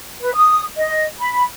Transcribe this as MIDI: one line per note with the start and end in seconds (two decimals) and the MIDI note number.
0.20 0.33 71
0.34 0.61 87
0.76 1.04 75
1.19 1.42 83